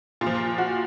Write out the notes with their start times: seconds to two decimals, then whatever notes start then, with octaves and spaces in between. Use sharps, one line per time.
0.21 A#2 F4
0.26 F3
0.58 F#4